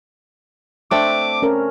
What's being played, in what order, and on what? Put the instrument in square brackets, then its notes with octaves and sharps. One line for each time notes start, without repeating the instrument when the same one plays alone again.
[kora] A3 C4 D4 [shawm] D6
[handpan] C#4 A#4